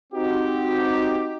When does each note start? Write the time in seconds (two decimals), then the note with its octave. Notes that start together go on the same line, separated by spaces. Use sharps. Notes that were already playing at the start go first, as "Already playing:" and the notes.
0.13 C4 D#4 F#4 G4